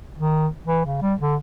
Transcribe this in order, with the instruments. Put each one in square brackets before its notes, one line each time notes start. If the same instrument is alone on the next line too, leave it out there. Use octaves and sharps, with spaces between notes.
[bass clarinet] D#3
E3
C#3
G3
D3